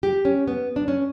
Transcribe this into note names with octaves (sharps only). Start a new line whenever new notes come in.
G4
C#4
B3
D4
C#4